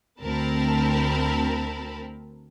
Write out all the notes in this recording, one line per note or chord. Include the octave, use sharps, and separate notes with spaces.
D2 C4 A#4 A5 B5